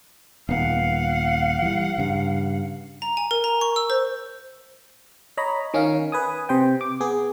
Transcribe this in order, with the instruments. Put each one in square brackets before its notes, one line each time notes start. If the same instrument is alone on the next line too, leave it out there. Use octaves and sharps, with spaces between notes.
[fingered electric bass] D#1 B3 [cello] F5 F#5
[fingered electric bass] E3 G3
G2 C#3
[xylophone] A#5
G#5
A#4
A#5
C#6
E6
C5
[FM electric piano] C#5 D#5 A#5 B5
D#3 C#4 D#4 F5
B4 G#5 D#6
C3 C5 G5
D6
B3 G#4